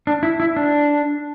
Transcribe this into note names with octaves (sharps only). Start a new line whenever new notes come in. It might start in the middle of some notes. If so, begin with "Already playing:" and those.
D4
E4
E4
D4